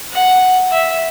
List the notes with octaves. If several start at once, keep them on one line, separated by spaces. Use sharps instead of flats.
F#5
E5